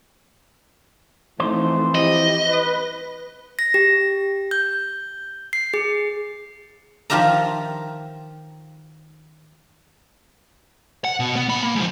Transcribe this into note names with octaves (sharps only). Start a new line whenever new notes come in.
E3 F3 A3 C4 D#4 C5
E4 G4 D#5
B4
A#6
G4
G6
C7
G#4
D#3 F3 F4 G4 E5 A#5
F#5
B2
B3
A#2 B5
A#3
G#2 F3